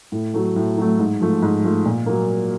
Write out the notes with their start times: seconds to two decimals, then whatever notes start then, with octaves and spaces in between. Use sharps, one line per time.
0.12 A2
0.34 F#3 A3
0.56 A2
0.78 F#3 A3
0.99 G#2
1.21 F3 A3
1.42 G#2
1.64 F3 A3
1.85 A#2
2.06 F#3 A#3